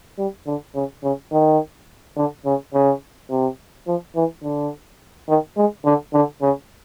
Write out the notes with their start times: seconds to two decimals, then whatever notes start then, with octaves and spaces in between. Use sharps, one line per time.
0.18 G3
0.47 D3
0.75 C#3
1.03 C#3
1.32 D#3
2.16 D3
2.45 C#3
2.74 C#3
3.30 C3
3.87 F3
4.16 E3
4.43 D3
5.28 D#3
5.57 G#3
5.85 D3
6.14 D3
6.42 C#3